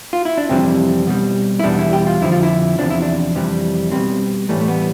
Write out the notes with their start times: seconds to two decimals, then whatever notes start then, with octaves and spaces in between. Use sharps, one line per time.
0.13 F4
0.25 E4
0.38 D4
0.49 F2 C3 E3 G3 C4
1.07 B2 G3
1.59 E4
1.64 E2 B2 G3 D4
1.79 E4
1.93 G4
2.07 F4
2.22 F2 D3 F3 E4
2.32 F4
2.43 E4
2.78 E2 C3 F3 D4
2.90 E4
3.02 D4
3.35 F2 C3 E3 G3
3.92 B2 G3 C4
4.49 A2 E3 G3 A3
4.61 A3
4.68 B3